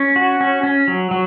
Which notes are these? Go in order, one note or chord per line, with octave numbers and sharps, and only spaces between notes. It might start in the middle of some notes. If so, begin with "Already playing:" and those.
Already playing: C#4
F#4
C#4
C#4
F#3
F#3